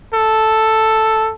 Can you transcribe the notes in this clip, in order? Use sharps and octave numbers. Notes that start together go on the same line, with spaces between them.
A4